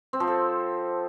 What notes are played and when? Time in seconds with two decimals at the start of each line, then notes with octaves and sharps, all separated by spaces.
0.13 C4
0.20 F3
0.27 A4